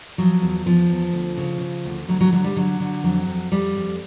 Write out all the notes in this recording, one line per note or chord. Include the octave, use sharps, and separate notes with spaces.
F3 F#3
E2
E2 F3
E2
D2
C#3
C#3
D2
D2 F#3
F#3
D3 F#3
G3
D3 F#3
D3
F2 F#3
F2
F2 G3
F2